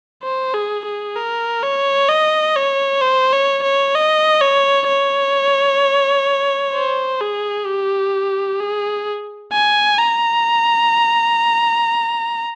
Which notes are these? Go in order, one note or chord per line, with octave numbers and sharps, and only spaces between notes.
C5
G#4
G#4
A#4
C#5
D#5
C#5
C5
C#5
C#5
D#5
C#5
C#5
C5
G#4
G4
G#4
G#5
A#5